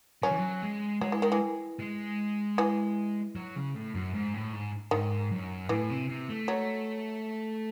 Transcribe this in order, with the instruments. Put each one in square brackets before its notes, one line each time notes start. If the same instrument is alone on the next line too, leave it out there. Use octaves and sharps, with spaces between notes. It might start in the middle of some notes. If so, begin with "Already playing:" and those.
[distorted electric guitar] F#3 [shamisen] C#4
[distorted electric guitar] E3
F#3
G#3
[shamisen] F#3 [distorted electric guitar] G#3
[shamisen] E3
D#3
E3
[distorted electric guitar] G#3
[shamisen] E3
[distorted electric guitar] F#3
C#3
A2
F#2
G#2
A2
G#2
[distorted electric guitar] G#2 [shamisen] D#3
[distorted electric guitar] F#2
[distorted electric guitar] A2 [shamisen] E3
[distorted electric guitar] C3
C3
A3
[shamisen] F#3